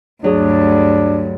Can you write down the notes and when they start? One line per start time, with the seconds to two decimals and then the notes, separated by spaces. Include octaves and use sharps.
0.24 D2 G2 F#3 D4 G#4